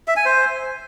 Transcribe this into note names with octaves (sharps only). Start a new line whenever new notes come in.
E5
G#5
C5